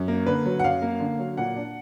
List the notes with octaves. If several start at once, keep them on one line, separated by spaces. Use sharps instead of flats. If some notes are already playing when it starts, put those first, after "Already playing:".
Already playing: F#2
A#3
D3 B4
F#3
F#5
F#2 F5
A#3
D3
F#3
A#2 F#5
D4